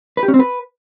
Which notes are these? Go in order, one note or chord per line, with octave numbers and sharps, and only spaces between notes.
B4
G4
C#4
C4
B4